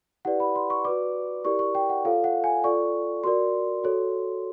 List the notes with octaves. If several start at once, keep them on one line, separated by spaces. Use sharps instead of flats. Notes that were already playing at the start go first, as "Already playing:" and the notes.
E4 G4 B4 D5 F#5
B5
C6
C#6
F#4 B4 D5 D6
E4 G4 A#4 D5 C#6
C#6
G5
F#5
F4 A4 C#5 F5
F#5
G#5
F4 A4 D5 C#6
F#4 A#4 D5 C6
F#4 A4 C#5